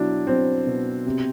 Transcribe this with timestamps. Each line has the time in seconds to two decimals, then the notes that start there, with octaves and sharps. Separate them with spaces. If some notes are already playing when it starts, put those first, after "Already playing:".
Already playing: B2 F#3 D4 E4
0.27 F#3 C4
0.67 B2
1.06 C3